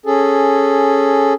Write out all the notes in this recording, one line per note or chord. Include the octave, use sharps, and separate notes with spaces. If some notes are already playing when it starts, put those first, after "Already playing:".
C#4 G#4 A4